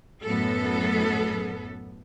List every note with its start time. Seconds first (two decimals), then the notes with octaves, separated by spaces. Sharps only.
0.25 F#2 A2 B3 A4